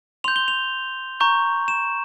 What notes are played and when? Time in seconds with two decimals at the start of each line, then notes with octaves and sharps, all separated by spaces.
0.24 C6 G6 F7
0.36 G7
0.48 F7
1.20 A#5 C#6 G6
1.68 E7